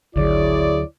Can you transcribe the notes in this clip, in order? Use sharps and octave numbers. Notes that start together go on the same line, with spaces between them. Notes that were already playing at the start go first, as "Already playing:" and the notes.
G#1 D2 D3 F#3 E4 G#4 C#5 D5